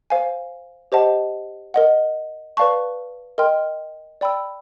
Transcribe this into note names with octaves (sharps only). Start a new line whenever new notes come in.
C5 F5 G#5
G4 C5 D#5 F#5 A5
A#4 D#5 F#5
B4 D5 F5 A5 C#6
A#4 D#5 G5 C6 F6
D5 G5 B5 E6